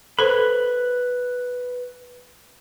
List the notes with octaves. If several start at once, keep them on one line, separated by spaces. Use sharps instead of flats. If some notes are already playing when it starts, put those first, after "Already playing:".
A4 B4 C5 B5